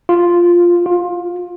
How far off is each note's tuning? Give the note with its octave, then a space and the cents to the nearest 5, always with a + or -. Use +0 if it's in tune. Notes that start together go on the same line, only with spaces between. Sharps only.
F4 +0
F4 +20